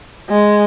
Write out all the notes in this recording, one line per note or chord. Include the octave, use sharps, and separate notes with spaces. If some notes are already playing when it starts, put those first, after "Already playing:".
G#3